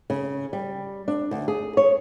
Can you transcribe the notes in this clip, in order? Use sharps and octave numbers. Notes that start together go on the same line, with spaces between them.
C#3
G3
D4
D2
G#4
C#5